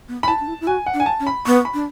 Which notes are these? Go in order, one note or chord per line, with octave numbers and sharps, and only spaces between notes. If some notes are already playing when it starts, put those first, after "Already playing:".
B3
B5
E4 A5
D4
E4
E4
F#4 G#5
F#5
D4
G#5
A5
C#4
B5
B3 C#6
B5
D4